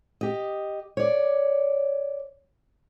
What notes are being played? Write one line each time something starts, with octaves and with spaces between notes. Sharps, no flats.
G4 D#5
C#5 D5